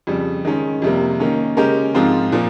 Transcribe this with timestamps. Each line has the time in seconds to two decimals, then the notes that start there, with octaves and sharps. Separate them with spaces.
0.07 F2 C#3 G3
0.45 D#3 G#3 C#4
0.82 F2 C3 G3 A#3
1.20 D#3 A#3 C#4
1.57 C#3 G#3 C#4 G4 A#4
1.95 G#2 F3 C4 F4
2.32 A#2 F3 A#3